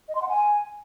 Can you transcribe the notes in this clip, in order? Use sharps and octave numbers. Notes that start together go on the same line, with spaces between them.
D#5
C6
F#5
G#5